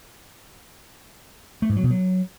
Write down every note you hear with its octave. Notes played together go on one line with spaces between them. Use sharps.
A3
G#2
F#3
B2
F#3